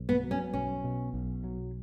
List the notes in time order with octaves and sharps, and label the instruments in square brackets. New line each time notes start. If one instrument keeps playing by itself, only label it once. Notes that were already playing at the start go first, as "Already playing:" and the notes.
Already playing: [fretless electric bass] B1
[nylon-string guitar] B3
[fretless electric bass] F#3
[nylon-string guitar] C#4
[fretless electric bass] B1 [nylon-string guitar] C#4
[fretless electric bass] B2
B1
F#3